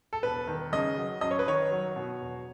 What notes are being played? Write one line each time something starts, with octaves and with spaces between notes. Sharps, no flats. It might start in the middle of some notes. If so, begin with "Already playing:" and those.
A4
E1 B4
D#3
C#3 D#5
F#3
F#2 D#5
C#5
B4
D#3 C#5
F#3
B2
E1